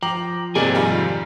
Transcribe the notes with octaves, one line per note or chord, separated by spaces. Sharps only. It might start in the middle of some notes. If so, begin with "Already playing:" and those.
F3 G5 A#5 D6
F2 G#2 C3 G#3 A#3 D5 G5 G#5
D#3 G3 F4